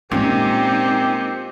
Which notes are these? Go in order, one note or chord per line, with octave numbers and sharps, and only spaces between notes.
A#2 G#3 C4 C#4 D#4 G4